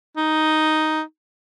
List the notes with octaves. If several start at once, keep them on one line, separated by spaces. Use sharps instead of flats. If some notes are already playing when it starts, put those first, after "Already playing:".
D#4